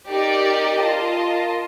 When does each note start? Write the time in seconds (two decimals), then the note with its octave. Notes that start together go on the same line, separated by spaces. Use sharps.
0.09 D#4 G4 A#4 D5
0.81 F4 A#4 D#5 A5